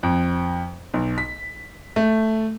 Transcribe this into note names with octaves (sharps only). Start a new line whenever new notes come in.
F2
B1
B6
A3